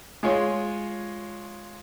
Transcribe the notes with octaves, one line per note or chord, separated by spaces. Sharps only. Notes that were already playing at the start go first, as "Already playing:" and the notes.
G#3 F4 C#5 G#5